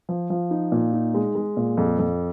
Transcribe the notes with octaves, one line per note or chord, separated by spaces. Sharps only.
F3
F3
D#4
A#2
D#4
G#3
G#3
A#2
F2
F2